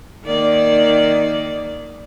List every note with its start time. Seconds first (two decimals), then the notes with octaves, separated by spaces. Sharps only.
0.25 D#3 A#3 D5